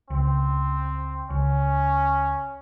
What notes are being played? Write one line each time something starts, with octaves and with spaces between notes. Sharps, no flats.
C#2 C4
C#2 C#4